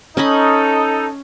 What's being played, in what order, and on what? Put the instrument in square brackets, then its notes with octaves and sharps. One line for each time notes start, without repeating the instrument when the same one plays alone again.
[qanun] C#4 D#5 B5 [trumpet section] D#4 A4